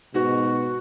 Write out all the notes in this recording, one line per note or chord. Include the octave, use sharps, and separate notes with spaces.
G#2 B2 F#4